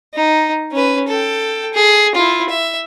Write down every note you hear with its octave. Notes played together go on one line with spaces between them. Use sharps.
D#4
C#4 B4
A4 G5
G#4
E4 F4
E5